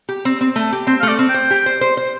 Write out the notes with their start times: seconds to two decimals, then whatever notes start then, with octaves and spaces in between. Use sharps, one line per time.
0.09 G4
0.25 C4
0.41 C4
0.56 A3
0.72 G4
0.87 C4 C5
1.00 A3 F5
1.08 D5
1.19 C4
1.29 G5
1.34 C5
1.51 G4
1.66 C5
1.81 C5
1.97 C5